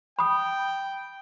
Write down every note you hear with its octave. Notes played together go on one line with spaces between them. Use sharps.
G5 B5 D#6